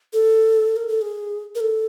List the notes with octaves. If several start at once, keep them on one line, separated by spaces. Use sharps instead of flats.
A4
A#4
A4
G#4
A#4
A4